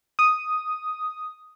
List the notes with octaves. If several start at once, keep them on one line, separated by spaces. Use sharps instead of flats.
D#6